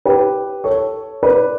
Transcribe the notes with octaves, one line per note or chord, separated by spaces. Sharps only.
G4 B4
A4 C#5
B4 D5